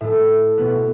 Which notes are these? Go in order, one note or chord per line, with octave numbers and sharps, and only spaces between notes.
A2 A3
B2 B3